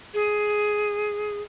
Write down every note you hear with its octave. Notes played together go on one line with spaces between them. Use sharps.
G#4